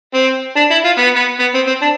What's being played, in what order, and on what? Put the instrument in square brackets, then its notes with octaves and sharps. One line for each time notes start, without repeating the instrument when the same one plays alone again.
[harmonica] C4
D4
E4
F4
B3
B3
B3
C4
C4
D4